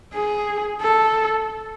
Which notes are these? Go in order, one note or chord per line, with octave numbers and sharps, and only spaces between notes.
G#4
A4